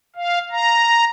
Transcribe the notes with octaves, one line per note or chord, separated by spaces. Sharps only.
F5
A#5